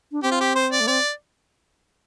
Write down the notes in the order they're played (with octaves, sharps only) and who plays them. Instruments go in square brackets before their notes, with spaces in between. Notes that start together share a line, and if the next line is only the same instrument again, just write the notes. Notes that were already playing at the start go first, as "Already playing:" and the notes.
[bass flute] D4
[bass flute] C4 [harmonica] G4
[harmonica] F4
G4
C5
D5
[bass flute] A3
[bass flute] C4 [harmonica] D5